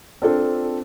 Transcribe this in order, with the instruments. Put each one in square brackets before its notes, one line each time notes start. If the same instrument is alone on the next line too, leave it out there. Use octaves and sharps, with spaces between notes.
[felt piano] C4 D4 F4 A4